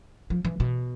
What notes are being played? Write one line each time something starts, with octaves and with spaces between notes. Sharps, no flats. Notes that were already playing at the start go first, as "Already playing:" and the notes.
F3
E3
B2